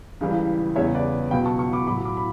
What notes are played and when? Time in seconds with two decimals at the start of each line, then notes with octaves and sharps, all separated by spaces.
0.21 C#2 C#3 E3 G3
0.76 E2 C#3 G3 C#5 E5
0.94 B4 D5
1.31 C#2 B2 F#3 G5 B5
1.45 A5 C#6
1.59 A5 C#6
1.72 B5 D6
1.87 A2 F#3 B5 D6
2.05 B5 D6
2.17 B5